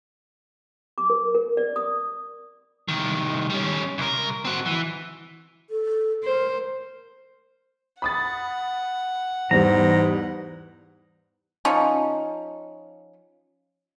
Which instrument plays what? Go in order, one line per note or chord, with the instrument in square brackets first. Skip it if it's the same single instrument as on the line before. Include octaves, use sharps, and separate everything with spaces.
[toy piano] D6
A#4
A#4
D5
D#6
[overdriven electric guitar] C2 D#3
G3 C#4
C2 A#4
C4 F#4
E3
[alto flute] A4
[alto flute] A#4 [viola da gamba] C5
[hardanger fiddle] F#5 [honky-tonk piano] B5 D#6 A6
[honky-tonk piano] E2 G3 [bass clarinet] G#2 [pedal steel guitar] A#5
[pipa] F3 C#4 D#4